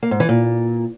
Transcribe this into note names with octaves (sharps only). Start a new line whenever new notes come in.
A#3
G#2
E3
A#2